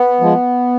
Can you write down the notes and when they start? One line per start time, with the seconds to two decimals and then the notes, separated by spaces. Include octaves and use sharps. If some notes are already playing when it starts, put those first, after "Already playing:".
Already playing: B3
0.21 F3 G#3